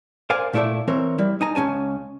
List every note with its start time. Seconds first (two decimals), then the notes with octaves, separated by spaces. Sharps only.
0.30 A#4 C5 D5 F5 G#5
0.53 A#2 A3 E4 A4 D5 E5
0.88 E3 C4 A#4 C#5
1.18 G3 E4
1.41 D#4 G#5 A#5
1.55 C#2 E3 C#4 G#5 A5